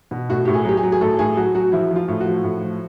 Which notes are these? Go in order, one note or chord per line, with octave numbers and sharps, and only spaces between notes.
B2
A2 F#4
A2 G4
G#4
F#3 G4
G#4
F#3
G#4
A2 A4
A2 G#4
F#3 F#4
F#3 F#4
F3 E4
F3 F4
A2
F#4
F3
A2
F3